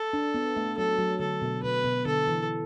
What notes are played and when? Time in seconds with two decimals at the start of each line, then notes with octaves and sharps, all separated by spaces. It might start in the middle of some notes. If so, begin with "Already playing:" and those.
Already playing: A4
0.13 D4
0.34 B3
0.57 A3
0.78 F#3 A4
0.99 F#3
1.20 D3 A4
1.42 B2
1.63 B2 B4
1.85 B2
2.05 D3 A4
2.28 E3